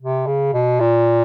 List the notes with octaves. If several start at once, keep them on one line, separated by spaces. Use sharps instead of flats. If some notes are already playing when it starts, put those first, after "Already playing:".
C3
C#3
B2
A#2